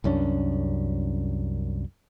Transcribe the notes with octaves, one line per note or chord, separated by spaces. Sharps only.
C2 F#2 C#4 D4